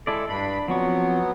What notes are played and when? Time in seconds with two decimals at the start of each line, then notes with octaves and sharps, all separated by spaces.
0.07 G#3 E4 A4 D5
0.29 G2 D4 B5
0.68 F3 F#3 B3 C4 C#6